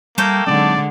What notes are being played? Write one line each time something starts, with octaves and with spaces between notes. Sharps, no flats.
G3 A3 A#3 A4 G5
D3 F#3 G#3 C4 D#4 D5